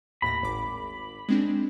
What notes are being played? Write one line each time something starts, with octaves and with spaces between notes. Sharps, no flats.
D#2 A2 B5 A#6
G#1 D6
G#3 C4 D4